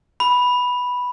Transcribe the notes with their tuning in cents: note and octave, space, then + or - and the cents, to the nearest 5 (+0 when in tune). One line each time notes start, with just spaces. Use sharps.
B5 -5